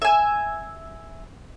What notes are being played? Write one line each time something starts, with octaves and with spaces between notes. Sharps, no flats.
E5 G#5